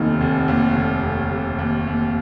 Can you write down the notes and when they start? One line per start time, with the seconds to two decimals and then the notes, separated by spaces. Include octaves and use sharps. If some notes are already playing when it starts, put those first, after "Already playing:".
Already playing: F1 D#2 D#3 D#4
0.21 F1
0.48 D#2
0.76 F1
1.03 F1
1.31 F1
1.59 D#2
1.87 D#2